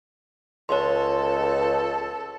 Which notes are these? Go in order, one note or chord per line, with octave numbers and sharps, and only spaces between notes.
C#2 A4 C#5 C6